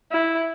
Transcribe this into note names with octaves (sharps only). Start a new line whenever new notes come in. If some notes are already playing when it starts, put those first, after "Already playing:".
E4